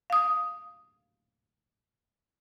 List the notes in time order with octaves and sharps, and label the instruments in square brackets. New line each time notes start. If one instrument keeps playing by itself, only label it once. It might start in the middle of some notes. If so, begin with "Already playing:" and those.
[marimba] F5 D#6